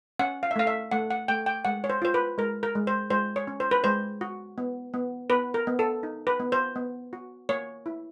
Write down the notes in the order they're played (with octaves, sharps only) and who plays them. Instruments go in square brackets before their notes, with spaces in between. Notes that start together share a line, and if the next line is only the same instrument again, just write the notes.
[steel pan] C#4 F#5
F5
E5
A3 F5
E5
A3 F#5
F#5
A3 G5
G5
G#3 F#5
C#5
C5
F4 C5
B4
G#3 A#4
A#4
G#3
C5
G#3 C5
C#5
C#4
C5
B4
G#3 C5
F#4
B3
B3
B3 B4
A#4
B3
A4
D#4
B4
B3
C5
B3
F#4
A#3 C#5
E4